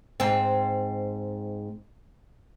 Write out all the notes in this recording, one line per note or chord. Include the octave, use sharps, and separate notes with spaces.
G#2 C4